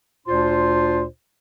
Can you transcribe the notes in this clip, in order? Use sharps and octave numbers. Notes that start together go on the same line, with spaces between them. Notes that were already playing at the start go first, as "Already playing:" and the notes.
D2 A#2 D4 F4 C5 C6